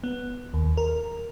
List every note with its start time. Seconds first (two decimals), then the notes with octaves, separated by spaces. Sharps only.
0.04 B3
0.54 D#2
0.77 A#4